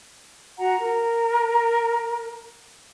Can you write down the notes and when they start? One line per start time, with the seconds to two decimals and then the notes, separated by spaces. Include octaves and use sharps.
0.58 F#4 F#5 A#5
0.79 A#4